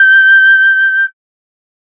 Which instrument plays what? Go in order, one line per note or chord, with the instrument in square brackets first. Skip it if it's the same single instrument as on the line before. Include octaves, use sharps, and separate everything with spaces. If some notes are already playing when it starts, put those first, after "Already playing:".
Already playing: [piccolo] G6